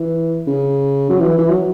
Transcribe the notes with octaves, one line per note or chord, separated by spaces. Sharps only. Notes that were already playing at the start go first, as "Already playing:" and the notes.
Already playing: E3
C#3
F#3
E3
E3
F#3